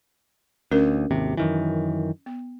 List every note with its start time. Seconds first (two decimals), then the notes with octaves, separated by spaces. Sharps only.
0.72 D2 C#4 A#4
1.11 G#1 D#2 C3
1.37 F#2 D#3 E3
2.26 B3